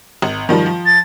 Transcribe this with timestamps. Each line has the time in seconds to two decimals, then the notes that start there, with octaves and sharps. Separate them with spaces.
0.22 G#1
0.49 D#3 F3 G3
0.66 F3
0.85 A6